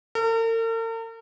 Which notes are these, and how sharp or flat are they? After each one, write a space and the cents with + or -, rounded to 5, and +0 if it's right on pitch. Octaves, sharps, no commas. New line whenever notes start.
A#4 -45